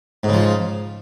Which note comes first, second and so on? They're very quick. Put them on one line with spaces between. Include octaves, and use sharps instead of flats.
G#2 C#3 F3